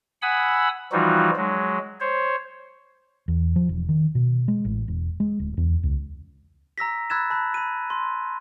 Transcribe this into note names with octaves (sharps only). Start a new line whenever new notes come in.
F#5 G#5 B5 D#6 E6
E3 F3 G3 D#4 F4 F#4
F#3 G#3
C5 C#5
E2
F3
E1
D#3
B2
G#3
A1
E1
G#3
D1
E2
C#2
A#5 E6 A#6 B6
B5 E6 F#6 G#6 A6 E7
A5 B5 F#6
B5 D#7
C6